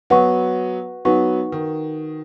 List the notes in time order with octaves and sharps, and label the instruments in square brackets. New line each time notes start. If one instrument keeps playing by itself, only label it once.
[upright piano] F#3 B3 [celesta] F#4 B4 F#5 C#6
[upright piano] F#3 B3 [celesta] D#4 F#4 B4 F#5 C#6
[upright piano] D#3